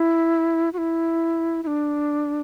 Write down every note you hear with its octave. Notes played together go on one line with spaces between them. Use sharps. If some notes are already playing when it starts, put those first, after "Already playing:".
Already playing: E4
F#4
E4
E4
D4